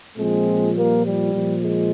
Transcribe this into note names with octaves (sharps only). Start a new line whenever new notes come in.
A#2 F3 G#3 C4
G3 A#3
G3
A#2 F3
G#3